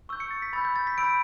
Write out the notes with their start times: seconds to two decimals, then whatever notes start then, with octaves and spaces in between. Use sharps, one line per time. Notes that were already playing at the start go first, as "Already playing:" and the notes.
0.09 C#6 E6 G6
0.20 C#7
0.31 A6
0.42 B6
0.53 B5 E6 G6 A6
0.65 G6
0.76 A6
0.87 B6
0.98 B5 E6 G6 D7